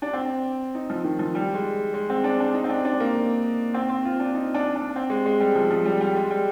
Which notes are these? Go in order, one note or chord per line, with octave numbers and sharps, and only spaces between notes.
D4
C4
D#4
F3
D#3
F3
G3
G#3
G#3
C4
D4
D4
D#4
C4
D4
D4
A#3
C4
C4
F4
D4
D#4
D4
D4
C4
G#3
G#3
G3
F3
F3
G3
G3
G#3
G3